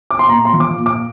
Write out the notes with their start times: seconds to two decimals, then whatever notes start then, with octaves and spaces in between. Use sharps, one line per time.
0.10 D6
0.19 C6
0.29 A#2 A#5
0.45 C6
0.53 F3
0.60 D6
0.77 A#2
0.86 D6